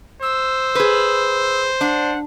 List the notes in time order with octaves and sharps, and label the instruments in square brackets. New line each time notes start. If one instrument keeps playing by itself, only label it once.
[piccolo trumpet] C5 [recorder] E6
[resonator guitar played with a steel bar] G#4 B4
[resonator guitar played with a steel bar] D4 [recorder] F#5